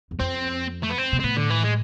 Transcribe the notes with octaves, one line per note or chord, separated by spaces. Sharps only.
E2
F2 C4
A3
B3
C4
B2
C4
A2 B3
D3
E3
G#3